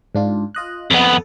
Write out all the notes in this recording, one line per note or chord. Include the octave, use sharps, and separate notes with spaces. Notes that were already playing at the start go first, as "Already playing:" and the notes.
G#2 D4 F4
F4 D#5 F#6
F2 B3 D#5
A4